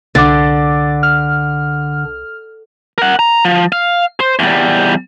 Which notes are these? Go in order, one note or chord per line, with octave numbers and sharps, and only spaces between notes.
C2 D3 D6 A6
F6
A#4 F#5
A#5
F3
F5
C5
E2 G3